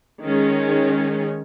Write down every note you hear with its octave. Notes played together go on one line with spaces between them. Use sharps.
D#3 G#3 C#4